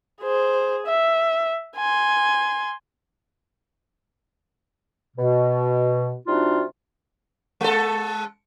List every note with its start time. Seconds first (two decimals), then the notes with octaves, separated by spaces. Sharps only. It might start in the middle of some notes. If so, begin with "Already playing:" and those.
0.22 G#4 C5
0.87 E5
1.76 G#5 C6
5.17 B2
6.28 C3 G3 D4 D#4 F4 F#4
7.61 G#3 A4